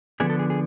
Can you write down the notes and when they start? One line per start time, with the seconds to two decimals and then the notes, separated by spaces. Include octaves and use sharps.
0.20 D3 F3 G#3 B3 D4 G#4
0.30 A4
0.39 G#4
0.50 G#4